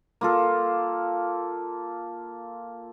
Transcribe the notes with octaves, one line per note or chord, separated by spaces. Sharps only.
A#3 F4 A4